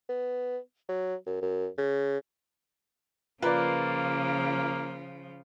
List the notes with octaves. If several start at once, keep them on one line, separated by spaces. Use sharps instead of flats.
B3
F#3
F#2
F#2
C#3
C#3 F3 A#3 F4 A#4 B4 D5